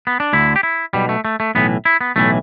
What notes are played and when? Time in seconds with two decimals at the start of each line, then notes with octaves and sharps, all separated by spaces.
0.07 B3
0.20 D4
0.33 D2 D3 E4
0.56 G4
0.63 E4
0.93 B1 B2 G3
1.09 A3
1.25 A3
1.40 A3
1.55 B1 A2 E3 B3
1.85 E4
2.01 B3
2.16 B1 A2 E3 A3